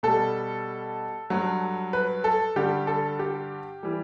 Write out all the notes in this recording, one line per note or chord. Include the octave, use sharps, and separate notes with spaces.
B2 G3 A4
G2 F#3
B4
A4
G2 D3 G3 G4
A4
G4
E3 G3